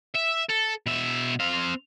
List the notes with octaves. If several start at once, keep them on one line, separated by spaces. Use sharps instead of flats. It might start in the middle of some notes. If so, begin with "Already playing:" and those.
E5
A4
B2 E5
C4 F5